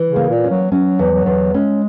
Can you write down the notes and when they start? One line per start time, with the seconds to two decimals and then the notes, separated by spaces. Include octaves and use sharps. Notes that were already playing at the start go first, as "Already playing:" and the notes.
Already playing: E3
0.09 C#3
0.16 A#3
0.29 A#2
0.44 C#4
0.50 F#3
0.71 F#3 C#4
0.99 E2
1.12 F#3
1.26 E2
1.54 G#3 C#4